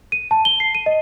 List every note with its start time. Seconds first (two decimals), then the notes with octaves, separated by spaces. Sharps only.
0.12 D#7
0.31 A5
0.45 G7
0.60 C7
0.75 D#7
0.86 D#5